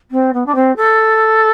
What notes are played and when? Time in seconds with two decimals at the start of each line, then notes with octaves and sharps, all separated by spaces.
0.11 C4
0.33 B3
0.46 D4
0.55 C4
0.76 A4